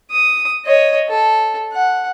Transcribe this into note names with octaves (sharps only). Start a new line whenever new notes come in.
D#6
C#5 D#5
A4
F#5